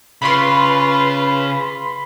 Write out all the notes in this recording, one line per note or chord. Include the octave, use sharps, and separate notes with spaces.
C#3 F4 B4 B5 C6